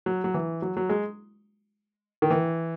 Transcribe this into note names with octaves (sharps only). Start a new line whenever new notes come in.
F#3
F#3
E3
F#3
F#3
G#3
D#3
E3